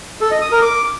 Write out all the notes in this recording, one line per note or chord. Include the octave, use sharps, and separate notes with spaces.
A4
D#5
D#6
A#4
D6